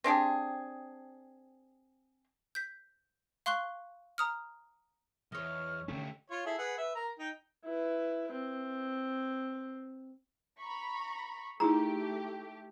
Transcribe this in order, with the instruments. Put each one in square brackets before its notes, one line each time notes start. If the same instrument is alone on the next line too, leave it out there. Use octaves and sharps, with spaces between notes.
[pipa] C4 D4 G4 G#4
[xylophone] G6 B6
F5 C6 C#6 F#6 G7
A#5 D#6 F6
[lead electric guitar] E2 [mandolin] C#5 D#5 [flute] F6
[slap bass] D3 D#3 C#4 [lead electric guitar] A3 G4
[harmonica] F4 C#5
E4 G#4 A4
G#4 B4 F#5
B4 E5
A#4 A#5
D#4 G5
[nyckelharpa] E4 B4
C4
[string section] A#5 B5 C#6
[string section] A3 G4 [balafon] D#4 E4 G#4 [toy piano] A#5